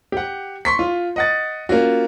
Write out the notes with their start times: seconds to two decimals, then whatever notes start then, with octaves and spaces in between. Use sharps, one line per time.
0.12 G4 F#5
0.65 C6 C#6 B6
0.79 F4
1.16 D#5 F#5 A6
1.69 A#3 C#4 F4 F#4